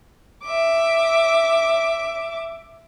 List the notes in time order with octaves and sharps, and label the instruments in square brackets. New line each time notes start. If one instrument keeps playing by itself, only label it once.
[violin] E5 D6